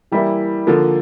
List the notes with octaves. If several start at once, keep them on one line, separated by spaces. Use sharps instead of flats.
E3 G3 A#3 E4
D3 F3 A#3